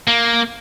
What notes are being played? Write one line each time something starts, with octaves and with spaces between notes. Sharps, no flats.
A#3